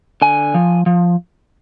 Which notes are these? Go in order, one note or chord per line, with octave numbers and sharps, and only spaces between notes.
D3 G#5
F3
F3